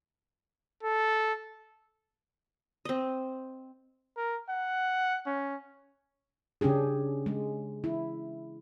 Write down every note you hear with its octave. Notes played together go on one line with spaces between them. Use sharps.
A4
C4 D#5
A#4
F#5
C#4
C#3 C#4 D4 G4 G#4
G#3
E4